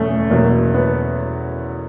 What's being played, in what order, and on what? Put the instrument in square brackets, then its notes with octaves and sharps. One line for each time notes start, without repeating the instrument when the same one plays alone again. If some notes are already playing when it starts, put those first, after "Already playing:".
Already playing: [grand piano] E2 B2 F#3 [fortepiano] A3 C#4
[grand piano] E2 B2 F#3 [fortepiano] A#3
[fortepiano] B3